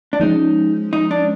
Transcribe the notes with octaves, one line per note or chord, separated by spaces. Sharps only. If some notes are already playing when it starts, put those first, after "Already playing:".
D4
F3 G#3 C#4 D#4
D#4
D4